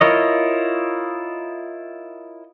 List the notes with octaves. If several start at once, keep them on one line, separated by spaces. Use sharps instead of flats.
E4 F4 A#4 C#5 D#5